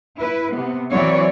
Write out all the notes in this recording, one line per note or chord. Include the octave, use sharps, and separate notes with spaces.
E4 B4
C3 B3
E3 F#3 C4 C#5 D5